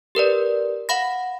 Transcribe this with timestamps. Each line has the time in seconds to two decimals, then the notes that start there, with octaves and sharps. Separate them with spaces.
0.15 G4 A#4 B4 D5
0.89 F5 F#5 B5 A#6